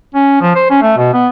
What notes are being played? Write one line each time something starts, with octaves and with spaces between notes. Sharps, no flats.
C#4
F3
C5
C#4
A3
B2
B3